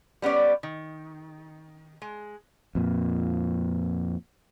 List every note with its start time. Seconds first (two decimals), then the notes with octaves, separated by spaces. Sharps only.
0.22 G3 B3 C#4 D5
0.63 D#3
2.02 G#3
2.75 F2 A#2